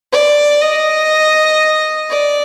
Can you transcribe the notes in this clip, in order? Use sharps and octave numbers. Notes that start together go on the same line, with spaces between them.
D5
D#5
D5